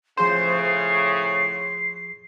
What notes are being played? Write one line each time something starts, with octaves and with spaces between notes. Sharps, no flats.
A2 C#3 F3 G#4 C5 G6 C7